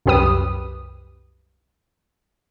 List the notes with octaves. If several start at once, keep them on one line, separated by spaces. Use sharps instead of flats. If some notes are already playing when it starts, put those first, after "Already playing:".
C2 F#2 G4 B4 D#6